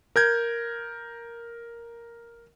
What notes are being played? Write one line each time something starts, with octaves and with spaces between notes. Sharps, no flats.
A#4 G6 G#6